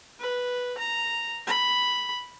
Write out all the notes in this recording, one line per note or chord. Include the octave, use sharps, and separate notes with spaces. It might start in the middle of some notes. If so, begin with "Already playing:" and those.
B4
A#5
B5